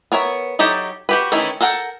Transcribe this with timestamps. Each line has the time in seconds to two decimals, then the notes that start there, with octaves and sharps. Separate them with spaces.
0.12 B3 A#4 C#5 E5
0.59 F#3 D#4 E4 G4 A4
1.09 F#4 G4 B4
1.32 D#3 E3 A3 C#4 E4
1.61 A4 A#4 F#5 G5